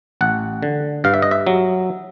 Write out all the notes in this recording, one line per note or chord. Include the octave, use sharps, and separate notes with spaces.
A1 F#5
D3
G2 F5
E5
D#5
E5
F#3